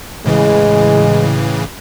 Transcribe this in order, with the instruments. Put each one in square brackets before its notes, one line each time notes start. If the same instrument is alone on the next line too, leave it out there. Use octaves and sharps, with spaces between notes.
[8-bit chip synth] A2 C#3 E3 [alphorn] G#3